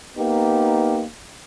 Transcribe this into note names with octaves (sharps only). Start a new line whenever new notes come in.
A#3 B3 D#4 G4